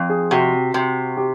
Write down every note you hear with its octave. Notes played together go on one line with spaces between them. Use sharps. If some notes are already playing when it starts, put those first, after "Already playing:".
Already playing: F2
G#4
C3 F#4
C3
G4